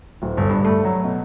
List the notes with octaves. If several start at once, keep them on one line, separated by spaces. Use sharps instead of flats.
D1
G1
G2
A3
F#3
B2